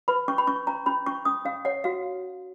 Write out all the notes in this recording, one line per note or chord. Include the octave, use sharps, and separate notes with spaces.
B4 B5
C#4 C#6
B5
C#4 C#6
C#4 A#5
C#4 B5
C#4 C#6
C#4 D#6
C#4 F5
C#5 F#5
F#4 F5